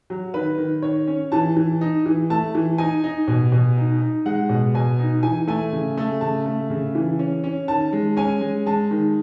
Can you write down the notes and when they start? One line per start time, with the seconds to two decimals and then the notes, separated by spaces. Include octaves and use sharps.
0.10 F#3
0.34 D#3 B4
0.58 D#3
0.82 D#3 C#5
1.07 C#4
1.32 E3 A5
1.57 E3
1.81 D#4
2.06 E3
2.30 A3 A5
2.55 E3
2.78 D#4 G#5
3.04 D#4
3.28 B2
3.52 B2
3.77 D#4
4.01 D#4
4.25 G#3 F#5
4.49 B2
4.75 B2 G#5
4.99 D#4
5.23 E3 G#5
5.48 A3 G#5
5.73 C#3
5.97 A3
6.21 C#3 A5
6.46 A3
6.70 C#3
6.95 E3
7.19 C#4
7.44 C#4
7.68 D#3 A5
7.93 G#3
8.17 C#4 G#5
8.41 G#3
8.66 G#3 A5
8.91 D#3